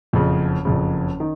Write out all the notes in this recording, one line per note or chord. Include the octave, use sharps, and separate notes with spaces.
F#1 F2 C#3
F#1 F2 C#3
D#3